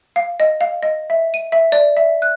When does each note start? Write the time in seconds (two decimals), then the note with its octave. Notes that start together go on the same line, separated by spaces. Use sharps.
0.16 F5
0.40 D#5
0.61 F5
0.83 D#5
1.10 E5
1.34 D#7
1.52 E5
1.72 D5
1.97 E5
2.22 F#6